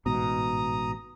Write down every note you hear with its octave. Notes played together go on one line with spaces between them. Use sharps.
A1 G#2 B2 A#5 D#6